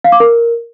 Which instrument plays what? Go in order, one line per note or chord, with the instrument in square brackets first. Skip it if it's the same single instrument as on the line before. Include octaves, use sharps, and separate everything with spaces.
[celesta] F5
D6
A#4